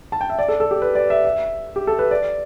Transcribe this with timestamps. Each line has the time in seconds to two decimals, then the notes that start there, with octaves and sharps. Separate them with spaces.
0.12 A5
0.21 G5
0.30 E5
0.39 D5
0.48 A4
0.60 A4
0.71 G4
0.82 B4
0.95 D5
1.10 E5
1.25 E5
1.76 G4
1.87 A4
1.99 B4
2.11 D5